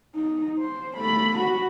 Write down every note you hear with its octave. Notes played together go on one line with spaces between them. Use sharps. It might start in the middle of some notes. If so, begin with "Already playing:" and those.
D#4
C5
A3 B5
F#4 B5